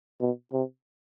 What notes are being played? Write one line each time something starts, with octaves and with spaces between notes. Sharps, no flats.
B2
C3